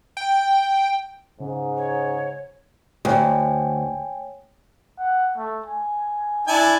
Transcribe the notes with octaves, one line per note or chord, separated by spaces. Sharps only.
G5
G#2 C#3
C#5
D2 C#5 G5 G#5
F#5
A3
G#5
D4 E4 G#5 A5